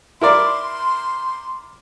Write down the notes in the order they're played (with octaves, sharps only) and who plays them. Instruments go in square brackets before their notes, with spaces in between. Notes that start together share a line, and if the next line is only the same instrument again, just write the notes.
[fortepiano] E4 A#4 D5 [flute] C6